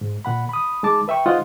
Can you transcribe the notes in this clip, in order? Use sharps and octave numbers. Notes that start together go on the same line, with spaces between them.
G#2
A#2 F#5 B5
B5 D#6
G#3 D#4 A5 D6
B4 E5 G5 C#6
G#3 D#4 F4 C5 D#5 F#5